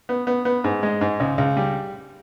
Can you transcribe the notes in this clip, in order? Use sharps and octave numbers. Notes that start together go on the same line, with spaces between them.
B3
B3
B3
G#2
G#3
G#2
C#2
C#2
G3